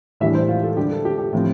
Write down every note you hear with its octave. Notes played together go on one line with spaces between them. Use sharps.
A2 E3 G3 D4 E5
C5
F4
A4
D3 G3 D4 G4
A4
G4
G4
A2 F3 C4